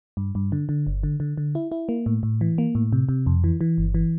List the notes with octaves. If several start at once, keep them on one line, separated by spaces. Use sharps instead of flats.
G2
G2
D3
D3
G1
D3
D3
D3
E4
E4
A#3
A2
A2
E3
A#3
A2
C3
C3
F2
E3
E3
G1
E3